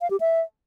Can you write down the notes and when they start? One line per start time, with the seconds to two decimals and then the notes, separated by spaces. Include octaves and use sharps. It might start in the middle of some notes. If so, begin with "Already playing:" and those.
0.01 F5
0.11 G4
0.20 E5